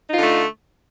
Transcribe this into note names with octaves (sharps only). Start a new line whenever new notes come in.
D3 A3 D#4 F4